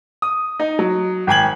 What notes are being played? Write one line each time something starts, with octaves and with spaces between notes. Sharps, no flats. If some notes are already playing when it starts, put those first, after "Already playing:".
D#6
D#4
F#3
G#1 G5 G#5 G#6 F#7